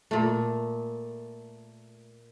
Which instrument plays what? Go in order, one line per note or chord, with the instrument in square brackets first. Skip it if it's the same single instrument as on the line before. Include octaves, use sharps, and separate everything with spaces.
[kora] A#2 A3